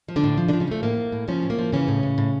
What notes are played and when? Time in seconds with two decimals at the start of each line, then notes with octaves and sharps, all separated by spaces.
0.08 F3
0.16 D3 D4
0.24 A2
0.37 F3
0.49 D3 F3 D4
0.60 C#3 C#4
0.68 F3 A3
0.83 A2 A#3
0.97 A2
1.12 A2
1.28 C#3 F3 C#4
1.42 A2
1.50 A#3
1.59 F3
1.73 C#3 E3 C#4
1.88 A2
2.03 A2
2.18 A2